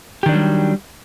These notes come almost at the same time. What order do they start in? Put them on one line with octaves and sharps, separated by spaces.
G4 D#3 D4 F#3 G3